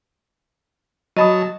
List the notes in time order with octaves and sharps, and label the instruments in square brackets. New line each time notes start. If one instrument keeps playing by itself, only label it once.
[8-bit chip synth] F#3 A5 [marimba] D#5 B5 D#6